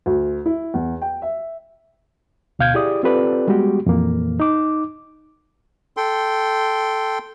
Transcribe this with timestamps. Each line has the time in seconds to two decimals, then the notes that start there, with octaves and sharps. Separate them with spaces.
0.06 D2
0.46 E4
0.74 E2
1.02 G5
1.22 E5
2.59 D2 B2 F5 G6 G#6
2.74 E4 G4 G#4 D5 D#6
3.03 C4 F4 G4 A4 B4 D5
3.48 G3 G#3 B3 F#4 G4
3.86 F2 A#2 E3 A#3
4.40 D#4 D6
5.97 A4 G5 C6